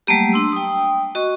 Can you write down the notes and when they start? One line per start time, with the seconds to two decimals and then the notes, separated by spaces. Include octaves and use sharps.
0.07 F#3 G3 A3 A#3 G4
0.33 D4 C6 E6
0.52 G5 D#6
1.15 F#4 D#5 C#6